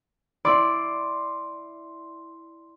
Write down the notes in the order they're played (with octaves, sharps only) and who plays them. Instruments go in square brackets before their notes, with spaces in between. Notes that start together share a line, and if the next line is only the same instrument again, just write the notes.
[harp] E4 D5 [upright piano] C6